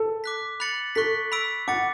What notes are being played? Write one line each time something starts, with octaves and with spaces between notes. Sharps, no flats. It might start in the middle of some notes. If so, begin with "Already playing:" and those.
Already playing: A4
D6 F#6 B6
B5 F#6 A6 C#7 F#7
A4 C#6 F#6 B6
B5 E6 B6 D7
F#5 D6 A6 C#7